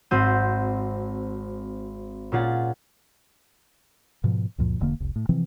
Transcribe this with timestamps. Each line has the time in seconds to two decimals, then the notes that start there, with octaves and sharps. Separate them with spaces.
0.11 G#1 C4 F#4 G6 D#7
2.32 A#2 C#4 F4 G#4 F#5 A6
4.24 G#2 B2 F3
4.58 C#2 F#2 A#2 F3
4.80 E1 D3 A#3
5.00 F1 C2
5.16 A2
5.29 C3 E3 F3 C4